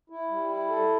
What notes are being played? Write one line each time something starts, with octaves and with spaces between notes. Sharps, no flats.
E4
G3
E4
A4